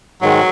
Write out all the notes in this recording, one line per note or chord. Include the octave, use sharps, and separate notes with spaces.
G#2 D#3 F#3 G#3